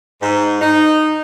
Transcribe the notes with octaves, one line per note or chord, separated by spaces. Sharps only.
G#2
D#4